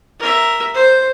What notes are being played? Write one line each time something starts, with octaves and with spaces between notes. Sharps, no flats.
A#4 E5
C5